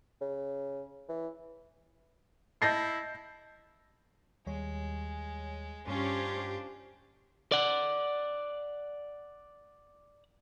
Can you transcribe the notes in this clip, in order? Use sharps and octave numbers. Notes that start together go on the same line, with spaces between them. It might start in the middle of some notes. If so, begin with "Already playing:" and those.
C#3
E3
E4 D#5 A5 G6 A6 A#6 C7
D#2 G3 G#3 C#5
G2 C#4 D4 F4 G4 C5
D5 F#5